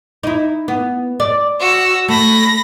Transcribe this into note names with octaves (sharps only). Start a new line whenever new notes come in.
D#4 E4
B3
D5
F#4 E6
A3 B5 A#6